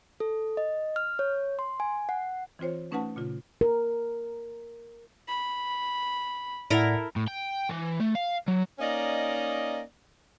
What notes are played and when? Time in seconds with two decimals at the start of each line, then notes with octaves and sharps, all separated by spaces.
0.20 A4
0.57 D#5
0.96 F6
1.19 C#5
1.59 C6
1.80 G#5
2.09 F#5
2.59 E3 C4 F4 C5 C#5
2.91 A3 C#4 D#4 B4 F#5 A5
3.16 A#2 C#3 F4
3.61 A#4
5.28 B5
6.70 A2 E4 A4 A#4 D5 F#5
7.16 A2
7.28 G5
7.70 E3
8.00 A3
8.15 F5
8.48 F#3
8.79 A#3 C#4 D#4 D5 D#5